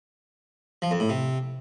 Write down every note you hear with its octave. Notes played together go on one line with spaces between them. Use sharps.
F3
F2
A2
C3